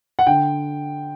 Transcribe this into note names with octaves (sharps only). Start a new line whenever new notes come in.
F#5
D3 G5